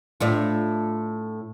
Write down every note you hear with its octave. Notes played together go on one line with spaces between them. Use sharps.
A2 D4 F4